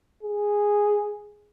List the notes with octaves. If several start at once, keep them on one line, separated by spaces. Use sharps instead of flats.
G#4